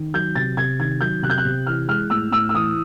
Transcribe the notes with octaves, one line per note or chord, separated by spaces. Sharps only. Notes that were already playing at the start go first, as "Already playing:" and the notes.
Already playing: D#3
F#3 G6
C3 A6
C3 G#6
D#3 G#6
F#3 G6
C3 F#6
G6
F#6
C3
E3 F6
G#3 F6
A2 E6
A2 E6
E6
E3 D#6